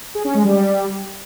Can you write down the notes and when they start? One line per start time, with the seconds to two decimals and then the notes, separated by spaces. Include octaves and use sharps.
0.15 G#4
0.25 C#4
0.34 G#3
0.44 G3